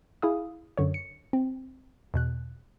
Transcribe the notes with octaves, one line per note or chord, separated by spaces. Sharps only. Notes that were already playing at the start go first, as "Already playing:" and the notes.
E4 G#4 F5 D#6
F#2 D3 C#5
C#7
C4
E2 B2 F#6